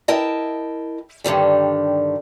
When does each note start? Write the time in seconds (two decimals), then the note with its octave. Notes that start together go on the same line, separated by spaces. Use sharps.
0.08 E4 A#4 D#5 G5 A5
1.24 G2 D3 D#3 G3